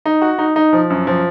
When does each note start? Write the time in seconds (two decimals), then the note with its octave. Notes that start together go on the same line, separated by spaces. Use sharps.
0.06 D#4
0.22 F#4
0.39 D#4
0.56 D#4
0.73 F3
0.90 F#2
1.07 F3